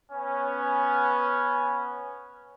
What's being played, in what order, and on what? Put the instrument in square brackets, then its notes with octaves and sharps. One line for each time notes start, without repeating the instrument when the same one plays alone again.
[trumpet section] B3 C#4